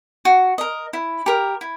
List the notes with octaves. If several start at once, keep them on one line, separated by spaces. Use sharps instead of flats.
F#4
A#4 D#5
E4
G4 A#4
E4